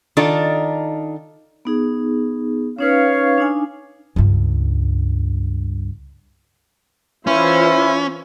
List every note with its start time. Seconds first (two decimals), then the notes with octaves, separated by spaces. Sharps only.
0.17 D#3 D4 D#4 F4 A4
1.65 B3 D#4 G#4
2.79 C#4 D#4 B4 C#5 F5
3.38 D4 D#4 G#5
4.16 C#2 G2
7.27 E3 C#4 E4 F4 C5